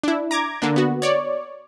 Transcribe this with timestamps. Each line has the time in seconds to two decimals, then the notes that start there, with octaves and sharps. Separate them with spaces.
0.04 D4 E4
0.31 A#5 D6 G#6
0.62 D3 A#3 D4
0.76 B3 F#4
1.02 C#5 D5